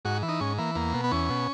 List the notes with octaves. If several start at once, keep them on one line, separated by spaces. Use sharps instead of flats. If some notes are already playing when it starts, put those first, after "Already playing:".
G#2 F#4
E3
D#4
G#2 C#4
E3 A#3
E2 A#3
B2
B3
E2 C#4
B2